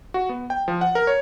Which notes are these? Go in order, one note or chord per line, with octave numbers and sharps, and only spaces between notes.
F#4
B3
G5
F3
F#5
A#4
C#5